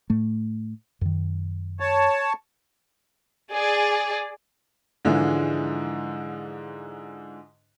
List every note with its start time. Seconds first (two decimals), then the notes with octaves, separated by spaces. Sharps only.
0.10 A2 A3
1.01 F#2 D#3
1.80 C#5 A5
3.53 G#4 D5
5.05 G#2 D3 E3 F3 G#3